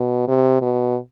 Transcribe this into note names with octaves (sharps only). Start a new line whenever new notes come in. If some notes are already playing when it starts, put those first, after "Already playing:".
Already playing: B2
C3
B2